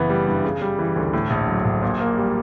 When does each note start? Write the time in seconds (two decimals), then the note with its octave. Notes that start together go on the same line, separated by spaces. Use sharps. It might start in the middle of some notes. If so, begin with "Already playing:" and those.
Already playing: F#1 E3 B3
0.10 G3
0.26 G2
0.44 C#3
0.62 G3
0.78 E3
0.96 D2
1.13 A2
1.30 A#1
1.48 F#3
1.65 A#1
1.82 A#2
2.00 A#3
2.17 G3